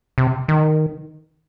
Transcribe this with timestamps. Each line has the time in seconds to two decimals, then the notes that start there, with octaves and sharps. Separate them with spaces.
0.18 C3
0.48 D#3